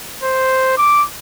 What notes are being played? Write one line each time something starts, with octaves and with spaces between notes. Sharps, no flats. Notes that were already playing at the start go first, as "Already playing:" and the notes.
C5
D6